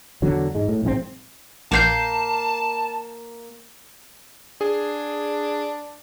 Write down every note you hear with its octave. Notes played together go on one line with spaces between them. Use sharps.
E2 D3 F#3
G#2 G#3
A2
A#1 G#2 D#3 C4
A#1 A#3 G5 A5 G6 C7
D4 G#4